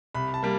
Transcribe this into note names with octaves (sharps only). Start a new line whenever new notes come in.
C2 B5
A5
G3 A#3